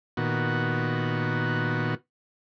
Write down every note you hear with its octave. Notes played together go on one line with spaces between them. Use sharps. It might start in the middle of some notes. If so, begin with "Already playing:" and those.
A#2 D#3 B3 F#4